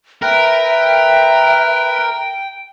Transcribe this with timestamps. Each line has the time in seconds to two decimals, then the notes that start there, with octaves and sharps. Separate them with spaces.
0.22 A#4 B4 E5 G5